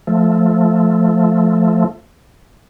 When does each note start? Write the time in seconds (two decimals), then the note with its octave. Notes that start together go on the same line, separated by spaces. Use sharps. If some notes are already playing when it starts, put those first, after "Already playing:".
0.07 F3 A3